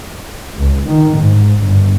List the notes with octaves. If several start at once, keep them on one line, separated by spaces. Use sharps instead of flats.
C#2
D#3
G#2
G1